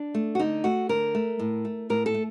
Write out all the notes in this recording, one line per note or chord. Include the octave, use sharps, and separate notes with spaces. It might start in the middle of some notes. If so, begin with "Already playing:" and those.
Already playing: D4
A3
F#4
D3 D#4
A3 F#4
D3 A#4
A3
A2
A3
A2 A#4
A4
A3